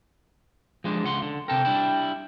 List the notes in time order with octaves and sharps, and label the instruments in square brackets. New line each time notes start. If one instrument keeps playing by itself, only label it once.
[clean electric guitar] F3 G#3 D4
C#2 F#5 C6
D3
[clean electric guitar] C3 A4 A#4 [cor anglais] G5
[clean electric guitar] G3 D4 E4